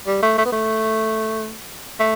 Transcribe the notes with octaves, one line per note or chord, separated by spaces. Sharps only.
G3
A3
A3
B3
A3
A3